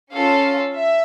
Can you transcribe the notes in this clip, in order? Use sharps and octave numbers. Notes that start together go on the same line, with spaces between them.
C#4 F4 A4 F5
E5